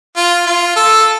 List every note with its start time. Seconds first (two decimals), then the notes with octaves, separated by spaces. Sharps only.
0.17 F4
0.47 F4
0.76 A4